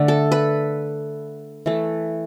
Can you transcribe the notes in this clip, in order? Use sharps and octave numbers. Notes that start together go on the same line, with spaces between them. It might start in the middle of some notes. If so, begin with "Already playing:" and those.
Already playing: D3 A3
A4
B4
E3 A3